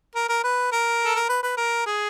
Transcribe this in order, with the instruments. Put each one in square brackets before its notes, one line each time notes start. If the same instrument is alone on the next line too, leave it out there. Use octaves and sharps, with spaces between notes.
[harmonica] A#4
A#4
B4
A#4
A4
A#4
B4
B4
A#4
G#4